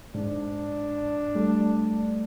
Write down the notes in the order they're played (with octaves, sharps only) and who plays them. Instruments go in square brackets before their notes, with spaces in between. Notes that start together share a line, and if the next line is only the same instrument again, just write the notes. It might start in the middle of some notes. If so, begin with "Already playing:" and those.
[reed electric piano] G#2 [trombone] D4
[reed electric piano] G3 A3